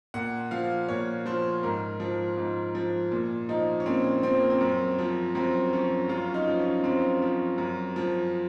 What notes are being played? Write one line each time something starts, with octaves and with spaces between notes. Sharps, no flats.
A#2 F#5
F3 F5
A#2 C#5
F3 C5
G#2 A#4
F3
G#2
F3
A#2
F3 D#4
C#4
A#2 C4
F3 C4
A#3
C4
F#2
F3
F#2 C4
F3 C#4
F#2 F4
C#4
D#4
F3
C#4
F#2 C4
F3
F#2
F3